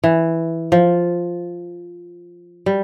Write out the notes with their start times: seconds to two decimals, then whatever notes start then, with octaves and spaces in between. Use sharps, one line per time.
0.04 E3
0.72 F3
2.66 G3